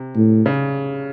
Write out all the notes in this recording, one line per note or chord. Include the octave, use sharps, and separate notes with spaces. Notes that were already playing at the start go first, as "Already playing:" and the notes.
Already playing: C3
A2
C#3